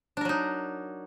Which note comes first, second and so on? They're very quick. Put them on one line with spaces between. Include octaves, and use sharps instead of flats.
D4 A#4 F#3 D#4